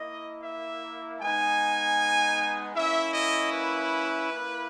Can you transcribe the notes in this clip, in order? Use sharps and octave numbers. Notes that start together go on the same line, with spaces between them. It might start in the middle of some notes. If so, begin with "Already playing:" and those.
Already playing: A#3 E4 D#5
E5
G#3 B3 D#4 G#5
A#3 C#4 E4 E5
D#5
B4
A#3 E4